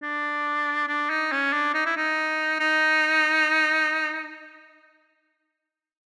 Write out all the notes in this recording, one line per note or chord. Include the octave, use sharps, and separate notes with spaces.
D4
D4
D#4
C#4
D4
D#4
E4
D#4
D#4